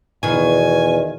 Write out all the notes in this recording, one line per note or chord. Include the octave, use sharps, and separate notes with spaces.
E2 B2 D#3 G#5